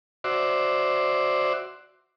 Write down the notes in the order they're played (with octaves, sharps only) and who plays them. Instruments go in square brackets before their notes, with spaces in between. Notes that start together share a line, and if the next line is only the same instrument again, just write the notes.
[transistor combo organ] F#4 C5 D5 E5